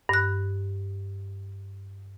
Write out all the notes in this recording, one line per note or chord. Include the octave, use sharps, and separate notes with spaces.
G2 F#6